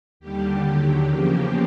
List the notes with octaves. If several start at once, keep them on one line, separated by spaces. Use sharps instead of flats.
D#2 D3 G3 G4
D#2 D3 F#3
E2 C#3 F3 A#3 G4